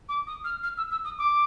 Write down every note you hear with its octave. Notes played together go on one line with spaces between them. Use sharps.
D6
D#6
F6
F6
E6
E6
D#6
D6